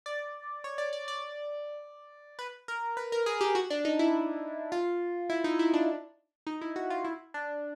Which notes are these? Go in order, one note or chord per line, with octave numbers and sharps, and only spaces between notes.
D5
C#5
D5
D5
D5
B4
A#4
B4
A#4
G#4
G4
F#4
D4
D#4
E4
F4
E4
D#4
E4
D4
D#4
E4
F#4
F4
E4
D4